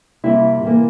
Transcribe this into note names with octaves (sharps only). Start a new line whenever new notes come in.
F2 C3 G3 A#3 E4
C3 E3 G3 A#3